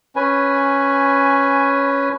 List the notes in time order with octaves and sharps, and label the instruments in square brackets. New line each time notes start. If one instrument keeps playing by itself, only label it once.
[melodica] C#4 B4 G#5